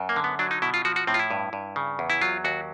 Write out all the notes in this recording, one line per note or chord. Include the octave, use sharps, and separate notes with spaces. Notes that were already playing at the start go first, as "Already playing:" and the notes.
Already playing: F#2
A#3
D3
B3
F#3 D4
D#4
B2 E4
F4
F3 F#4
F#4
A2 C4
F4
E4
G2
G2
C#3
E2
E4
F#3 F4
D#2 F#4